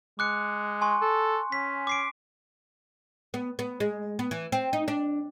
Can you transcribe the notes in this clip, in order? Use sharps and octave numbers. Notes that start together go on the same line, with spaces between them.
G#3 D6 F#6 C#7
G#5 C6 C#6
A4
C#4 B6
D6 C7 D7
B3
B3
G#3
B3
E3
C4
D#4
D4